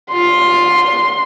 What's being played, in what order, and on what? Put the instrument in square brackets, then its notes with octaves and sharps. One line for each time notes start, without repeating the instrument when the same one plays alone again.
[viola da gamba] F4 [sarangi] C6